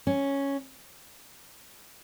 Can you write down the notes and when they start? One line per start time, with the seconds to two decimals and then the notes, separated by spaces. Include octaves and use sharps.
0.07 C#4